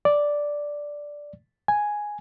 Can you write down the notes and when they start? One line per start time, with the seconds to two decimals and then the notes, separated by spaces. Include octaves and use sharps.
0.05 D5
1.68 G#5